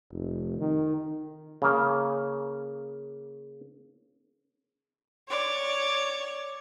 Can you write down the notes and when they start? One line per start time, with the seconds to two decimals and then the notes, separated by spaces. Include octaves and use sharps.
0.12 F1
0.59 D#3
1.62 C#3 A#3
5.28 C#5 D5